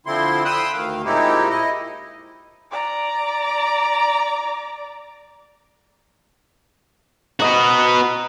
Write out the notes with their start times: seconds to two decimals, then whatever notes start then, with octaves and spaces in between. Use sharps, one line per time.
0.06 D3 F3 C4 E4 C6
0.45 G5 B5 C6 D#6 E6 F#6
0.73 D2 D#3 F5
1.05 A#2 G#3 C4 D#4 E4 G4
1.49 E4 D#5
2.71 D5 A#5
7.40 B3 F#4 D#5 A#5